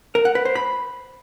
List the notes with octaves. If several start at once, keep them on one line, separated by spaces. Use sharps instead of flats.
A#4
F#5
B4
C5
B5